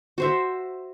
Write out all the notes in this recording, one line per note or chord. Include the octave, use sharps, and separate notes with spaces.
F#4 C5 E5